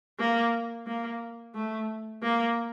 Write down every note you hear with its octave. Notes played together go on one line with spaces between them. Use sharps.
A#3
A#3
A3
A#3